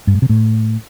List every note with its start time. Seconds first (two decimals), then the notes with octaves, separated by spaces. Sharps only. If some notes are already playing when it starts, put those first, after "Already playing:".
0.07 G2
0.15 G#2
0.22 C3
0.29 A2